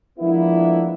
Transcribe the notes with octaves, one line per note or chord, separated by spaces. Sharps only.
F3 G#3 A#3 B3 D4 E4